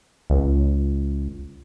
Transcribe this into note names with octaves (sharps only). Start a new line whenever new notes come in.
C#2